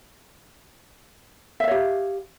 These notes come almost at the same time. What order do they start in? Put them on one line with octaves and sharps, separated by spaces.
E5 F5 C#5 G4